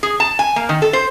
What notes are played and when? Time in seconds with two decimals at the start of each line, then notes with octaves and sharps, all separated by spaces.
0.03 G#4
0.20 A5
0.39 G#5
0.56 A#3
0.69 D#3
0.82 A4
0.93 C5